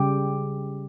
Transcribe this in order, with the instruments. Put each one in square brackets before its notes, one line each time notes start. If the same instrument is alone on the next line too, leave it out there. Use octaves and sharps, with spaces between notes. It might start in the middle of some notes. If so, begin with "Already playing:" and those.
Already playing: [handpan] C#3 G3 G4